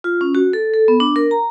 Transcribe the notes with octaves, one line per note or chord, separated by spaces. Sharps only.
F4
C#4
F#4
A4
A4
B3
D4
A#4
A#5